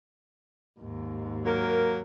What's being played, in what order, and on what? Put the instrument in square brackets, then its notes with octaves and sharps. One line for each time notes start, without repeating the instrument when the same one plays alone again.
[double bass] D#2 G#2
[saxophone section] F#3 A#3 A#4